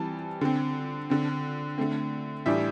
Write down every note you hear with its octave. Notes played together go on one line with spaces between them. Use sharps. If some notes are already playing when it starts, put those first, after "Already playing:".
Already playing: E3 G3 C4 A5
D3 C4
D3 C4
D3 A3 C4
A2 E3 G3 D4 E5